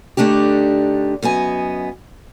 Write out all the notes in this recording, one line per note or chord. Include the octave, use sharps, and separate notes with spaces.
D3 A3 D4 D#4 G4
F#2 B3 D#5 G#5